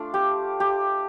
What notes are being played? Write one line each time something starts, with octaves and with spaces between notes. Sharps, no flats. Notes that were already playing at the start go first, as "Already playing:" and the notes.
Already playing: A3 D4 F4
G4
G4